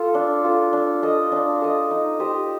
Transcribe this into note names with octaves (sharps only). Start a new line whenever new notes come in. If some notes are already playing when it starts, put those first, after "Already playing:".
Already playing: F4 A4
D4
F4 A4
D4
A4 D#5
D4
A4 D#5
D#4
G4 C5 D#5